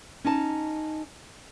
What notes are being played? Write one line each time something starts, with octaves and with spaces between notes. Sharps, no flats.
C#4 D#4 A5